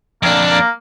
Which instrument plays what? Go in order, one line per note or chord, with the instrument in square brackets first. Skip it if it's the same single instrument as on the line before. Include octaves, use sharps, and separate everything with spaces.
[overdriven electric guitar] F2 D4 [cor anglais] A#3
[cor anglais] A#3